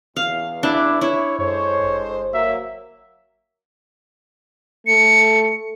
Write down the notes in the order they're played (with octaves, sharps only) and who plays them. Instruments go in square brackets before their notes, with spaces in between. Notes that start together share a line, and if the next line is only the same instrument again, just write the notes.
[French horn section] E2 [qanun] F5
[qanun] D4 [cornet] E4
[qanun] E4 [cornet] C#5
[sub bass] F#2 [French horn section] G#3 A4 C5 [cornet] C#5
[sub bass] G1
[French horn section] F#3 A#3 [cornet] E5
[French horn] A3 [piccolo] C#7